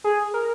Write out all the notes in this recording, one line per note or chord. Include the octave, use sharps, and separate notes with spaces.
G#4
A#4